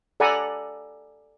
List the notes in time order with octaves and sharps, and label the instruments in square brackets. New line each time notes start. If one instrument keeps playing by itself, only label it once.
[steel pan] A4 D5 F#5 G#5 A#5 B5